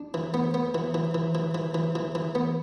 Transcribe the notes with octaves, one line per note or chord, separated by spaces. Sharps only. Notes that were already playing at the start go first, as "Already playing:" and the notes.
Already playing: D4
E3
B3
B3
E3
E3
E3
E3
E3
E3
E3
E3
B3